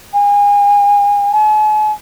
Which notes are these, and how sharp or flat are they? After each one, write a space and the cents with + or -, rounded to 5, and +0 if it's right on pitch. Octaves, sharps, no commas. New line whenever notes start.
G#5 -35
G#5 +45